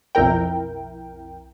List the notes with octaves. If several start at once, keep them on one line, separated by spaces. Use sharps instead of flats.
B1 F2 E4 A#4 G5